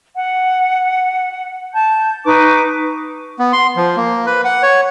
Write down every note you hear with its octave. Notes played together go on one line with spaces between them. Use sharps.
F#5
A5 G6
D#4 B4 C#6 D6
B3
C6
F3
A#3
B4
F#5
C#5